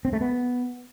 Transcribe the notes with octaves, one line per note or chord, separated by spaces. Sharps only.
C4
A3
B3